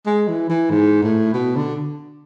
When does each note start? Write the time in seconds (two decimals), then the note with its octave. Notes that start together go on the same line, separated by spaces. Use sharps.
0.07 G#3
0.28 E3
0.49 E3
0.71 G#2
1.03 A2
1.34 B2
1.56 D3